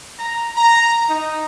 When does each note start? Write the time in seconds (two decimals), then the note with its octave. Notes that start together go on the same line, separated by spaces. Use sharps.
0.18 A#5
0.56 A#5
1.08 D#4